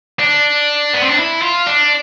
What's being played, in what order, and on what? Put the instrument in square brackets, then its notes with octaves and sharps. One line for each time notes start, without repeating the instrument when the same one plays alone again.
[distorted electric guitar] D4
B3
C4
D4
E4
F4
D4